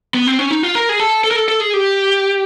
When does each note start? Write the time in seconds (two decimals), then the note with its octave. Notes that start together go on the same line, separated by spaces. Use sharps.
0.14 B3
0.27 C4
0.39 C#4
0.51 D#4
0.63 F4
0.75 A#4
0.89 G#4
1.00 A4
1.24 A4
1.31 A#4
1.36 A4
1.48 A4
1.60 G#4
1.73 G4